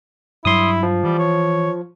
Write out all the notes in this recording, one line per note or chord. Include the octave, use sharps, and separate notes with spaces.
G2 F#3 G3 E4 C6 D#6
F3
E3 G3
C#5